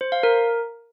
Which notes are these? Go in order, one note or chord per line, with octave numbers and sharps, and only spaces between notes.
C5
F5
A#4